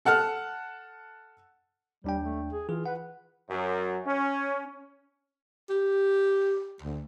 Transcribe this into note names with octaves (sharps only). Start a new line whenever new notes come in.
A4 F#5 A5 F6
D#2 G3 D4 G5
A3
G#4
E3 F4 G#4
B4 F#5
F#2
C#4
G4
D2